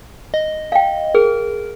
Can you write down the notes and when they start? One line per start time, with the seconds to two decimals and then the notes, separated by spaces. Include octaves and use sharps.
0.34 D#5
0.72 F5 G5
1.15 G#4 A#4